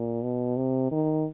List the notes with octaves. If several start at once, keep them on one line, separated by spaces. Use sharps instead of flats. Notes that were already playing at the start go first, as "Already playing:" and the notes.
Already playing: A#2
B2
C3
D#3